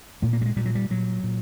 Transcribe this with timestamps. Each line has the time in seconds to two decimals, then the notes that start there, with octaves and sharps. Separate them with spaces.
0.22 A#2 A3
0.33 A#3
0.42 G3
0.46 G#3
0.56 A#2 G3
0.66 F#3
0.75 G3
0.90 A#2 F#3
1.24 A#2